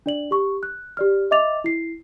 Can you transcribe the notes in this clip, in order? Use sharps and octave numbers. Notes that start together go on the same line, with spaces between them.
D4 D5 F#7
G4 C#6
F#6
G4 D5 F6
D#5 E5 D6 A6 F7
E4 C7